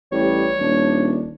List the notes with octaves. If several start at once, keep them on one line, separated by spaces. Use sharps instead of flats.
A1 G3 C#5
D#1 D4